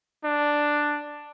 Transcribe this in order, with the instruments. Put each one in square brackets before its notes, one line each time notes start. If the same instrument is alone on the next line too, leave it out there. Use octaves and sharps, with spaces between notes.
[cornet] D4